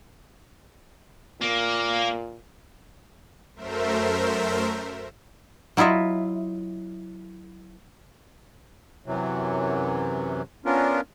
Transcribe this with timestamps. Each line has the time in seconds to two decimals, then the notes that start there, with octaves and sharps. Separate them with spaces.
1.41 A#2 A#3
3.56 F#2 A3 A#4 C5 E5
5.77 F#3 E4 F4 D#5 E5
9.06 F#2 C3 E3 F#3
10.65 B3 C#4 D4 F4 A#4